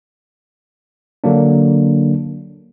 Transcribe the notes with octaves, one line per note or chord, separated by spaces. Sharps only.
D3 F#3 A#3 D4